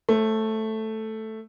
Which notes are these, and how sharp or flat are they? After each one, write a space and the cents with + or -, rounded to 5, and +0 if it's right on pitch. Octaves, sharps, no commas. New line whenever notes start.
A3 +0 C5 +40